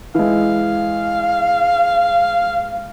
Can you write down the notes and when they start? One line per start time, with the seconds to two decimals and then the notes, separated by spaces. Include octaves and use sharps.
0.15 E3 G#3 F5